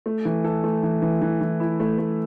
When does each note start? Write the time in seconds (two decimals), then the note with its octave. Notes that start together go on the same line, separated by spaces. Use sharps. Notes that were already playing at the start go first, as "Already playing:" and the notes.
0.06 A3
0.25 E3
0.44 A4
0.64 A3
0.83 E3
1.02 E3
1.22 E3
1.41 E3
1.60 E4
1.80 A3
1.98 A3